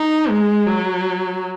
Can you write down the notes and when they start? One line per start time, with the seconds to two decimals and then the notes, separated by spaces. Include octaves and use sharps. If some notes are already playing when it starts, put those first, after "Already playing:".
Already playing: D#4
0.30 G#3
0.67 F#3